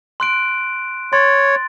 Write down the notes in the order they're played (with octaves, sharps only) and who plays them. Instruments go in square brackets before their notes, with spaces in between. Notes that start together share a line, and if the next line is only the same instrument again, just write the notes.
[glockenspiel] C6 F#6 D7
[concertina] C#5 [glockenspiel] C6 A6